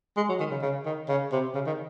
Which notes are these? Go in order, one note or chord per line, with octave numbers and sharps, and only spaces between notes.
G#3
F#3
D#3
C#3
C#3
D#3
C#3
C3
C#3
D#3